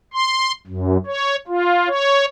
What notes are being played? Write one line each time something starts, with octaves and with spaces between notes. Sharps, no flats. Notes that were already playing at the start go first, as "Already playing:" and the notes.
C6
F#2
C#5
F4
C#5